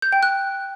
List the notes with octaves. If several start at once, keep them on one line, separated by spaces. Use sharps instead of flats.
G6
G5
F#6